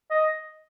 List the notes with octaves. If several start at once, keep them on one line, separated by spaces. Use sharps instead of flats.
D#5